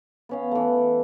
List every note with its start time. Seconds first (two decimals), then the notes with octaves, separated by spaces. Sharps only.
0.29 B3 C#4 F5
0.52 E3 A3